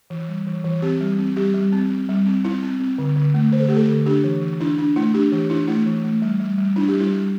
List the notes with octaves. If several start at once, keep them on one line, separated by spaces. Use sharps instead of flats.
E3
G3
E3
E3
C4 G4
G3
C4
G3 G4
G3
C4
C4
G3
C4
C4 E4
C4
C4
D3
D3
A3
D3 C5
A4
A3 G4
A4
D3
D4 G4
E3
E3
D4 E4
D4
A3 E4
D4 G4
E3 G4
D4 E4
A3 E4
E3
A3
G3
G3
G3
D4 E4
G4
G3
E4
G3